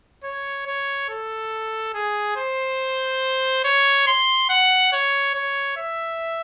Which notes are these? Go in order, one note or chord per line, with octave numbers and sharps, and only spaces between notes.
C#5
C#5
A4
G#4
C5
C#5
C6
F#5
C#5
C#5
E5